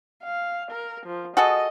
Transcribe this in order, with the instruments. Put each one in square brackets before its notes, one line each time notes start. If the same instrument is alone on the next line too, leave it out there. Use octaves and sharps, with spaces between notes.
[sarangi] F5
A#4
F3
[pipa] F#4 G#4 A4 [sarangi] D#5